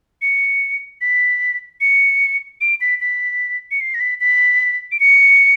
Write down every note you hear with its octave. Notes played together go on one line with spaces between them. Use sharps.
C#7
B6
C#7
D7
B6
B6
C#7
C7
A#6
B6
B6
D7
C#7